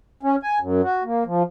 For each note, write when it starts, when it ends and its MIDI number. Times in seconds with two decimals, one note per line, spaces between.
0.23 0.36 61
0.43 0.59 80
0.60 0.82 42
0.83 1.03 66
1.04 1.24 58
1.26 1.43 53